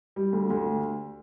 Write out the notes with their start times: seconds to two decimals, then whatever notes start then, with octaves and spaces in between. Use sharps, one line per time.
0.16 G3
0.33 D2
0.50 D2